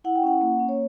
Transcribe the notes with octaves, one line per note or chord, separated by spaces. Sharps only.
E4 F#5
G5
C#4 F#5
A#3
C#4
C#5